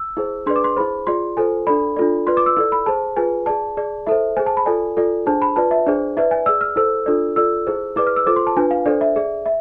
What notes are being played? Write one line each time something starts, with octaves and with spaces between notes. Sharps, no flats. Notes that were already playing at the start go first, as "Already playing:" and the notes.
Already playing: E6
E4 G#4 C5
D4 G#4 B4 D5 C6
D6
C6
E4 G#4 C5 B5
F4 G#4 D5 C6
F4 A4 C5 G#5
D4 A4 D5 B5
D4 F4 A4 D5
F4 B4 D5 C6
D6
E6
E4 A4 D5 E6
B5
G#4 C5 A5
F4 G#4 B4 G#5
G#4 D5 A5
G#4 D5
E4 A4 C5 E5
G#4 C5 G#5
A5
B5
F4 A4 D5 G#5
F4 A4 D5
D4 G#4 C5 A5
B5
F4 B4 D5 A5
E5
D4 G#4 C5 D5
E4 B4 D5 E5
G#5
G#4 D5 E6
F6
E4 A4 C5 E6
D4 F4 A4 D5
F4 A4 D5 E6
E4 G#4 C5
E4 G#4 B4 D5 D6
F6
E6
F4 A4 C5 D6
C6
A5
D4 F4 B4 G#5
F5
D4 A4 C5 D5
E5
G#4 D5
E5